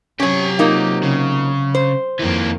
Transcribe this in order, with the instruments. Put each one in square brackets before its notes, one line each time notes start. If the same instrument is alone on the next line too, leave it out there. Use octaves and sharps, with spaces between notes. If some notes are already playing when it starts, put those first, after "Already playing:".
[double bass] C3 F#3 [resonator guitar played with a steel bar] C#4 C#5 [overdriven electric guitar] G4 G#5
[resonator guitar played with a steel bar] A#3 D#4 F4
[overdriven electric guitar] C#3
[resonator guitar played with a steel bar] C5
[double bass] F2 D#3 [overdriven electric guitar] E3 A#3